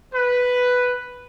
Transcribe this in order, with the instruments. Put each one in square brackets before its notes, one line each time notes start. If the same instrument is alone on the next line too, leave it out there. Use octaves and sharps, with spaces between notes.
[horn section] B4